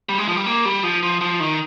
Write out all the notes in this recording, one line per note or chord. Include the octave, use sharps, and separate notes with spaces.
G3
G#3
F3
G3
A#3
G3
F3
F3
F3
D#3